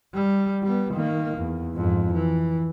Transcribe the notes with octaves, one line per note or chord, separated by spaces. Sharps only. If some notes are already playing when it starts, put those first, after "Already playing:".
G3
G3 B3
D#3 A#3
E2
F2 G#2
E3